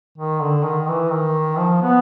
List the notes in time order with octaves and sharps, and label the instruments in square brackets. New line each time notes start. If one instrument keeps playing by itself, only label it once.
[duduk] D#3
D3
D#3
E3
D#3
F3
B3